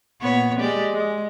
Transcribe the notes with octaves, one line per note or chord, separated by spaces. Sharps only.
A#2 B3 C#5
G#3 G4 D5
G#3